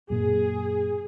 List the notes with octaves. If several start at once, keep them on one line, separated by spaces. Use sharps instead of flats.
F#2 A#2 G#4